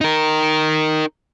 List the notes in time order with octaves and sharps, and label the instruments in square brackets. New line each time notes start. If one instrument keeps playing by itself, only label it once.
[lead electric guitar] D#4 A#4